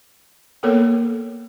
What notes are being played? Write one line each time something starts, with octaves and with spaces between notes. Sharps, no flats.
A#3 B3 A4 A#4 C#5